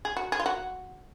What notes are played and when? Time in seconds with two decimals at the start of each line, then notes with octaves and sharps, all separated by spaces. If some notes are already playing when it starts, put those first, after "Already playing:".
0.05 G#4
0.17 F#4
0.32 G#4
0.40 F4
0.46 F#4